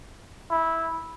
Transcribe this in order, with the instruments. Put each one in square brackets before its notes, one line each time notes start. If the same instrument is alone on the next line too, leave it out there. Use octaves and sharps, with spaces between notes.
[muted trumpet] E4